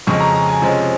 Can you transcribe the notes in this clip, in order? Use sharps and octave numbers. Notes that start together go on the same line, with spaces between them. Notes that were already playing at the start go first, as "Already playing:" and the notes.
F2 C#3 G#3 C#4 C#6
A#5
A#5
G#5
C3 F3 G#3 C#4